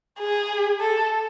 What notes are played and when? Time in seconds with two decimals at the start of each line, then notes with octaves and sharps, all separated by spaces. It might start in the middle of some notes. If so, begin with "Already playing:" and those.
0.19 G#4
0.80 A4